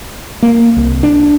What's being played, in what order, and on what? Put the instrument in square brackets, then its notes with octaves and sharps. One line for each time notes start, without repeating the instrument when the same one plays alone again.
[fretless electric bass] A#3
C2
D4